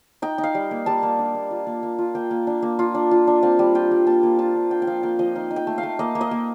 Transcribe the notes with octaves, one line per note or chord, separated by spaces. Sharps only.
D#4 G5
D#4
F5
G3
A#3
G3 A5
A#3
D4
A#3
F4
A#3
A#3
F4
A#3 G5
A#3
D4
A#3
F4
D4
F4
D4
C4 F5
G3
F4 G5
G3
A#3 A5
A#3
F4 A5
D4
D4 G5
G5
F3 F5
A#3 G5
F3 D#5
D#4 F5
D#4
G5
A3
F5
A3
A#3 D#5
A#3
D#5
A#3